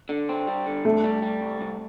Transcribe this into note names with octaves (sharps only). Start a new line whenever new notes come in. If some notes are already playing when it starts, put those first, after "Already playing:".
D3
C4
G3
D3
C2 A3
G3
G3
C2
C2